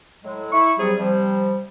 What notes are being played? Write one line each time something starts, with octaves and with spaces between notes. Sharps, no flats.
A2 F#3 G#3
E4 C#6
C3 F#3 G3 G#4
C3 F3 G3